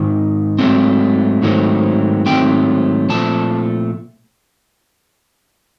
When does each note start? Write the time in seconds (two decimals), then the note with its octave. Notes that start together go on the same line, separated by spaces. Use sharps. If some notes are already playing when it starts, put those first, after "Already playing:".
Already playing: G#2 D#3
0.59 G#2 D#3 F#3 A3 C4
1.42 G#2 D#3 F#3 A3 C4
2.26 G#2 D#3 F#3 A3 C4 G5
3.09 A#2 F3 A3 C4 A5